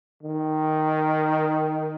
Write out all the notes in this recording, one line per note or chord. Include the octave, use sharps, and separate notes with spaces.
D#3